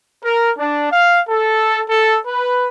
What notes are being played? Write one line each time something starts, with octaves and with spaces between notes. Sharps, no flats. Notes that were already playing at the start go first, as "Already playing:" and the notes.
A#4
D4
F5
A4
A4
B4